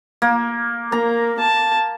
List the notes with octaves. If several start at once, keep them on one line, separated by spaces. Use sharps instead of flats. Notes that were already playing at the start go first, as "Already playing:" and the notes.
A#3
A#3 A#5
A5